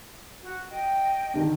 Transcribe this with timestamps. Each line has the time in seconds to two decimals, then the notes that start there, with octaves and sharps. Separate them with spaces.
0.42 F#4
0.70 D#5 G5
1.34 D3 D#3 D4